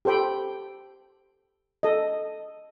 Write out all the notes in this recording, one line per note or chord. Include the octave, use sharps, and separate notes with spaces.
G4 A4 C5 G5 B5
A4 D#5